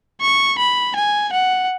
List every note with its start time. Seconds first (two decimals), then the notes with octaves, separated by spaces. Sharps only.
0.21 C#6
0.59 B5
0.96 G#5
1.33 F#5